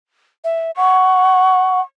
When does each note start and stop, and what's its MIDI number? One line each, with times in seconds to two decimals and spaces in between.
0.44 0.71 76
0.77 1.81 78
0.77 1.81 85